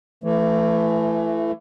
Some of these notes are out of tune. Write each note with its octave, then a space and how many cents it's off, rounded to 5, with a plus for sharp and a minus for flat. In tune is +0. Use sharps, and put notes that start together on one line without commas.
E3 +25 A3 +0